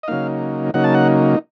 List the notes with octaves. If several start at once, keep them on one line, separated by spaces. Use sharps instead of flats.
D#5
C#3 F#3 A#3 D#4 F5
C#3 F#3 A#3 D#4 F#5
A5
F#5